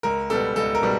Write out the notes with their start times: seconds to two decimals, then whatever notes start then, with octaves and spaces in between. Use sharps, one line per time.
0.03 C#2 A#4
0.30 B2 G3 B3 A4
0.56 C#2 A4
0.75 A#4
0.83 B2 G3 B3